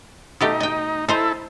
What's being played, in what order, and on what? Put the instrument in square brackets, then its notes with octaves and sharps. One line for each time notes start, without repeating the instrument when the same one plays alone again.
[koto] B2 A3 G4 [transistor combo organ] D#4
[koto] D#5 G5
[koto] D#4 C5 [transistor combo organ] E4 A4